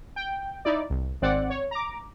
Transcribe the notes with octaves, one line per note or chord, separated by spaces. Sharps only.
G5
D#4 E4 D5
C2
G#1 C4 D5 F#5
C#5
A#5 D6